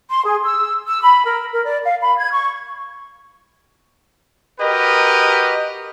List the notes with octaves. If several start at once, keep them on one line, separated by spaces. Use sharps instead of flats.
C6
G#4
E6
E6
B5
A#4
A#4
D5
F5
B5
G#6
C#6
F#4 G4 A#4 B4 D#5